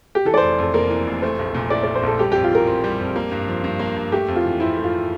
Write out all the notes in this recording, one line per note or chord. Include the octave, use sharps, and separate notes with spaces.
G4
E3 A4
D5
F1 C5
F2 A4
A#3 A#4
E3
F1
A3 C5
A#1
A#2
E4 D5
A3 D5
C5
A#1 A4
G3 G4
F2 G4
F4
E3 A#4
C4
G3
F2
A#3
G2
F3
G2
A#3
G2
A3 G4
F2
F4
E3
C4 E4
A3
F4